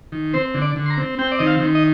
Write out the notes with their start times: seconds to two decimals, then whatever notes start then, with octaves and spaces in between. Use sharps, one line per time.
0.12 D#3
0.34 C4 C5
0.54 D3
0.62 D5
0.76 D3
0.86 C6
0.90 A#5
0.97 C4
1.19 C4 G5
1.32 D5
1.39 D#3 D#5
1.47 F5
1.60 D#3
1.75 D#5